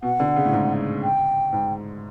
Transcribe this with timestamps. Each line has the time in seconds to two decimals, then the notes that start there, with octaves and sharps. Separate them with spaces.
0.02 B2 F#5
0.20 D3
0.36 C#3
0.45 A2
0.53 G#2
1.03 G5
1.52 G#2